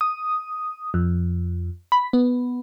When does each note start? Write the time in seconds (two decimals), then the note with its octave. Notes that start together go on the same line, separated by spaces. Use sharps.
0.01 D#6
0.94 F2
1.92 B5
2.13 B3